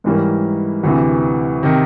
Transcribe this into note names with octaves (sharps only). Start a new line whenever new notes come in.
G#2 E3 G3 A#3 C#4
D2 C3 E3
C3 D#3